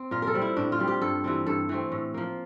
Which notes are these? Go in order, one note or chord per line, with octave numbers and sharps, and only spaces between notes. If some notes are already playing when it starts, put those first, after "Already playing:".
Already playing: C4
A#2 F4
A#4
A4
G3 C4
E4
A2 D4
F4
G3 C4
G4
G2 A4
E3 G3 C4
G2 A4
E3 A3 C4
A2
F3 A#3